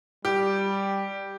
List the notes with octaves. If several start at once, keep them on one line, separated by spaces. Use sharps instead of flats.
G3 G4